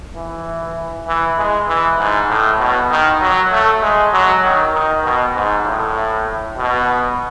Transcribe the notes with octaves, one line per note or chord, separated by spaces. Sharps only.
E3
E3
G#3
E3
G#2
A2
B2
D#3
F#3
A3
G#3
F#3
D#3
D#3
B2
G#2
A2
B2